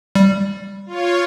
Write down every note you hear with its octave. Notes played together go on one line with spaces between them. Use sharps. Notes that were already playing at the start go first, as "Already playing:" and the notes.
G3
F4 C#5